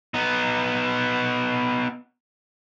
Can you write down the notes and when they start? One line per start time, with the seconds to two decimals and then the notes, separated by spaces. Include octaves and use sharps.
0.14 B3 D#4